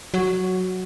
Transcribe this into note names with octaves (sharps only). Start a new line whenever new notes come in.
F#3